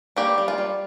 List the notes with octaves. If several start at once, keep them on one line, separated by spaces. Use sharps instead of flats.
G3 A#3 G4
G3
F4
G3